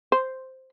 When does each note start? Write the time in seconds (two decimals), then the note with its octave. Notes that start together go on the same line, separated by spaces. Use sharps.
0.12 C5